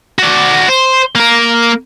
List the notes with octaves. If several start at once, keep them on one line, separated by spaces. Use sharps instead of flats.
F#4 D5
C5
A#3 A#4